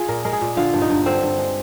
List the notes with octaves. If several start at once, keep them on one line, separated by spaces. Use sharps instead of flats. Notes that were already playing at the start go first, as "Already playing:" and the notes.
Already playing: F4 G#4
A#2 A#4
G#3 A#4
G#4
A#2
D3 F4
G2
D#4
G2
D3 C4
G2
G#3